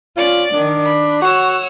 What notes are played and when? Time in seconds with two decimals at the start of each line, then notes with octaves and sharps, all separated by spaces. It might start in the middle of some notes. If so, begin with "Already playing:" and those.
0.17 C#4 F4 D5
0.53 D#3 D4
0.84 B5
1.22 F#4 C#5 F#5 E6